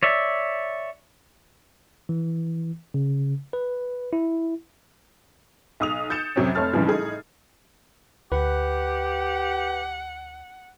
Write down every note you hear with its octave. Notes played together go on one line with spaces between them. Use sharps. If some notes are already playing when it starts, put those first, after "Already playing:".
C#5 D5 E5
E3
C#3
B4
E4
B1 D#6 F7
G6 A6 C#7 E7
F2 C3 F#3 C4 C#4
F1 A3 C#5 A5 F6 A6
B1 G#2 C#3 E3 F3 G3
A2 D#4 G#4
D2 G4 B4 F#5